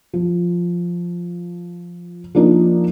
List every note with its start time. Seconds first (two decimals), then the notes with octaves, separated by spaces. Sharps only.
0.13 F3
2.35 F3 A#3 D4 D#4 F4